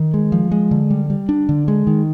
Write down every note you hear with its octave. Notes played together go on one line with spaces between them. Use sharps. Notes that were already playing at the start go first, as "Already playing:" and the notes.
Already playing: D#3
G#3
F3
G#3
D3
G3
G3
D4
D3
G#3
D#3